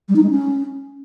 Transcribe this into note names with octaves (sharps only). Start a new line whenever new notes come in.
G3
D#4
G#3
C#4